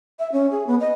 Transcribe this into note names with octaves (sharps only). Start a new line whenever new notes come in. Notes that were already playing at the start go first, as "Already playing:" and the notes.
E5
C#4
G#4
B3
D#5